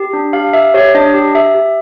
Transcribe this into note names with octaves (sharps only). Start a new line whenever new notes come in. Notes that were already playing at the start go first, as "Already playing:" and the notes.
Already playing: G4
D4
G4 F5
G4 E5
G4 C#5
D4 D#5
G4
G4 E5
G4